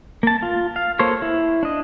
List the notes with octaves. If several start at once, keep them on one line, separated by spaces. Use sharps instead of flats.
A#3 A5
F4
F5
A#3 A4 C5 C#5
E4
D4 D#5